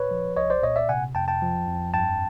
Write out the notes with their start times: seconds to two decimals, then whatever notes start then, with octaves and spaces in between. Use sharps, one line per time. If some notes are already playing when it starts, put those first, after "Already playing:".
Already playing: A#2 B4 C#5
0.11 F3
0.36 C2 C#5 D#5
0.50 C5 D5
0.62 A#2 C#5 D#5
0.76 D5 E5
0.89 C3 F#5 G#5
1.15 F2 G5 A5
1.28 G5 A5
1.42 F3
1.68 F2
1.94 G2 G5 A5